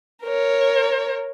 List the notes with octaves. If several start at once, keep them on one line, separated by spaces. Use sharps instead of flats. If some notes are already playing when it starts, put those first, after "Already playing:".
A#4 C#5